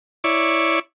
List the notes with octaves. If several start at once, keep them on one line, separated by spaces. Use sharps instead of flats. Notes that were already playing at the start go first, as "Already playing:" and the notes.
E4 C#5 D5